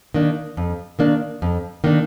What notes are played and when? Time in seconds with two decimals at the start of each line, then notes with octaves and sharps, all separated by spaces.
0.14 D#3 A#3 D4
0.57 F2
0.99 D#3 A#3 D4
1.42 F2
1.84 D#3 A#3 D4